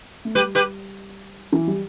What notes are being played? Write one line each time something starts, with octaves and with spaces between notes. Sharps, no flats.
A3
G3 G4 B4
G4 B4
E3
G3